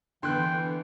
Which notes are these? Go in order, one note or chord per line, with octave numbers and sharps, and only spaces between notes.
D3 E3 B3 G5 C6 F#6